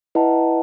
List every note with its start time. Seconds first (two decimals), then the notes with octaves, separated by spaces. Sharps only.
0.15 E4 B4 D#5 F#5 A5